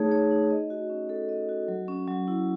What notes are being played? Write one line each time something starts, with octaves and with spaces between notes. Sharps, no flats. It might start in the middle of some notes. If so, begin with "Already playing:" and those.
Already playing: A3 D#4 G#4 C#5
C#5
D#4
D#5
F#4
C#4
A4
D#5
F#4
F#3
C#4
F#3
E4